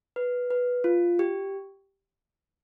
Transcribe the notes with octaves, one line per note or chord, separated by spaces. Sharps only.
B4
B4
F4
G4